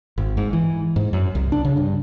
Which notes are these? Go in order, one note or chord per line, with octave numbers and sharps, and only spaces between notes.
G#1
G#2
E3
G#2
F#2
C2
D4
C#3
G2